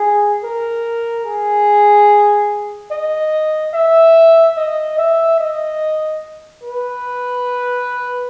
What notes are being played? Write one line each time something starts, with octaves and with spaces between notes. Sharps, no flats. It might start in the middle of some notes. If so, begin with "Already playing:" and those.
Already playing: G#4
A#4
G#4
D#5
E5
D#5
E5
D#5
B4